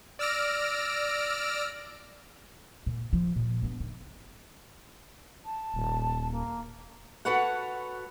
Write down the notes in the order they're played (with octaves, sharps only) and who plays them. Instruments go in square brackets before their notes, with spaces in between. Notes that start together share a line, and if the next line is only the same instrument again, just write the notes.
[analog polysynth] D5 E6 F6 A#6 D7
[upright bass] A#2
F3
A#2
G2 B3
D#3
[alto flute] A5
[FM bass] D#1
[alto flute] A#3
[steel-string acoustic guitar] F#4 A4 B4 C#5 F#5